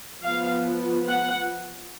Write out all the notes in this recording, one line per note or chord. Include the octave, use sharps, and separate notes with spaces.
F3 B3 F5
F#5